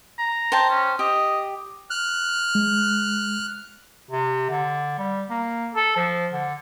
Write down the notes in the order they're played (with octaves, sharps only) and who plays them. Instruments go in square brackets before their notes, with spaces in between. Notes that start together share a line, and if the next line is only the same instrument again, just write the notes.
[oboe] A#5
[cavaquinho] C5 G5 A5
[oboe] C#4
[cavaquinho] G4 [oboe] D#5
[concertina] F6 F#6
[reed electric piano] G#3
[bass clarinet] C3
D3
G3
A#3
A4
F3
D3